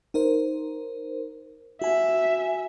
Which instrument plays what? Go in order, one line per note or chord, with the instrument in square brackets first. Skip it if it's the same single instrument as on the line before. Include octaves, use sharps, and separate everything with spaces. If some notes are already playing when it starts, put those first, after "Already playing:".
[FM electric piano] D#4 A#4 C5
[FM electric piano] F#4 G#5 [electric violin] E5